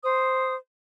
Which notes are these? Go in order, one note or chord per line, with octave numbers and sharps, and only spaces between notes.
C5 D#6